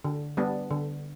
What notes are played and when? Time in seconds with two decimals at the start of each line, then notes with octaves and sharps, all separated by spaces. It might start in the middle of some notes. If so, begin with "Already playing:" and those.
0.05 D3
0.37 G3 B3 D4
0.71 D3